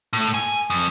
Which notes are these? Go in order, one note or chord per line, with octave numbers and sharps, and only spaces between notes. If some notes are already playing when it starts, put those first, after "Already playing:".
A2
G#5
F2